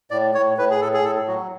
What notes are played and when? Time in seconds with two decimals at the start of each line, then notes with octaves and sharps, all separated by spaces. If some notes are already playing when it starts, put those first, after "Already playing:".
0.11 A2 D5
0.35 A2 C#5
0.58 A2 B4
0.71 G#4
0.81 A2 A4
0.94 G#4
1.04 A2 A4
1.28 F#3 F#4